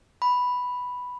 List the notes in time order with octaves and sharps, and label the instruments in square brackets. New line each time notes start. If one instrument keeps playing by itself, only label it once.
[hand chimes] B5